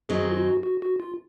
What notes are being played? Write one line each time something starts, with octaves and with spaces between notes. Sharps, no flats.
F#2 D#3 F#3 C4 D#4 G#4
F4
F#4
F#4
F#4
F4